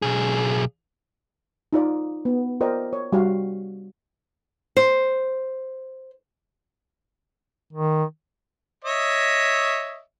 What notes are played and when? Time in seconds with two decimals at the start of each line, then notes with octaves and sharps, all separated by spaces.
0.02 B1 G#4
1.73 D#4 F4 D5
2.25 B3
2.61 F4 A#4 C5 D5 D#5 G5
2.93 C#5
3.12 G3 F#4 F5
4.77 C5
7.73 D#3
8.85 C#5 D#5 E5